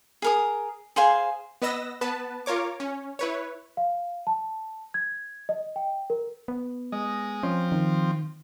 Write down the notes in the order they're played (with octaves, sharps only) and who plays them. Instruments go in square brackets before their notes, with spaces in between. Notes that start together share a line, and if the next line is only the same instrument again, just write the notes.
[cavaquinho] G#4 A#4 D#6
G#4 C5 F5 G#5
[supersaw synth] B3 B4 D#5 E6 A#6
B3 B4 A5
F4 A#4 C#5 D6
C#4
E4 B4 C#5
[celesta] F5
A5
G#6
D#5
G5
A#4
[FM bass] B3
[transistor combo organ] G#3 D#5
[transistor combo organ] F3 C4 [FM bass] C#4
[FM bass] D#3